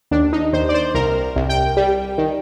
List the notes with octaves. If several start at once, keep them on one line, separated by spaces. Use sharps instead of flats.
D#2 D4
D#4
D#2 C5
D5
C5
C2 A#4
C2
G5
G3
D#3